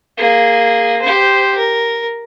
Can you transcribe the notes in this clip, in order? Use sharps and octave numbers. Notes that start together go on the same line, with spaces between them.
A#3 G#4
G4 C5
A#4